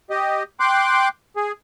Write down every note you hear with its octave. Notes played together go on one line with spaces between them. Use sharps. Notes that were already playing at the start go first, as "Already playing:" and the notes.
G4 D#5
G5 C6 D6 F#6
G#4